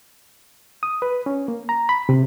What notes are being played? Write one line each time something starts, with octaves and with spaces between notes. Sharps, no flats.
D#6
B4
C#4
A#3
A#5
B5
C3